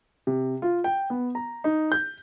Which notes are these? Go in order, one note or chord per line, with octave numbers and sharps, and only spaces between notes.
C3
F4
G5
B3
A#5
D#4
G6